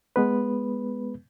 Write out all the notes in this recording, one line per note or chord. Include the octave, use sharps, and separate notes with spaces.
G#3 B3 B4